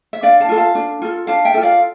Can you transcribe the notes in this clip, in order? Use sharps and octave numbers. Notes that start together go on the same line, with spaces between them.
E5
D4 D5 F5
F5 A5
F4 A4
F5 A5
D4
F4 A4
D4 F5 A5
E5 G5
F4 A4
D5 F5